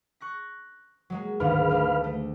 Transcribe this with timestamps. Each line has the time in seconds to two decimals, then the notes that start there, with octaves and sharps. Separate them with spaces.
0.21 C#6 F#6 A#6
1.10 F#3 G#3 A#3
1.40 D2 G#2 D#3 B4 F5
1.70 G#3 A3 D4
2.04 A3